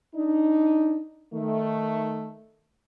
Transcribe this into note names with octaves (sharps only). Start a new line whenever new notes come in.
D4 D#4
D#3 A3